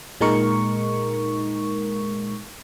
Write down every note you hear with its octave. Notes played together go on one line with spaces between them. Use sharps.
A#2 G#3 D#4 A#4 C#6